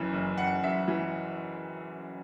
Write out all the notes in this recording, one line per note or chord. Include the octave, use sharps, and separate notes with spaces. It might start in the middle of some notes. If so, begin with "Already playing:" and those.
Already playing: F#1 F#2 E3
F#1
F#1 F#5
F#2 E5
E3